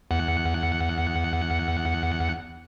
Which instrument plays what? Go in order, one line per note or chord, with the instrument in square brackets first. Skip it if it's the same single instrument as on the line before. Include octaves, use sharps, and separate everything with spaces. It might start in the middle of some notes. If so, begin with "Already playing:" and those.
[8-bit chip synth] E2 F#5 C#7